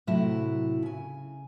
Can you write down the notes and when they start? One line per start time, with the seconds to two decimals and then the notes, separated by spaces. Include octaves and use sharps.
0.07 A2 C3 F#3 E4 F#4 E5
0.83 C#3 G#5